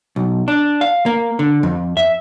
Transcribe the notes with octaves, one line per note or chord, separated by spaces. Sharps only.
B1
D4
F5
A#3
D3
F2
E5